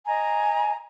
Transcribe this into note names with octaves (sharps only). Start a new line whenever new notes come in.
D#5 G#5 A#5